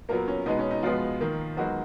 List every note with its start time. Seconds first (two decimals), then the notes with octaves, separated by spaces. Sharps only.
0.09 A#2 F#3 A#3 B3 A#4
0.28 C#4
0.46 B2 G#3 B3 D#4
0.59 C#4
0.71 D#4
0.83 B2 F3 G#3 B3 F4
1.20 D#3 A#3
1.57 D#3 F#3 G#3 B3 F#4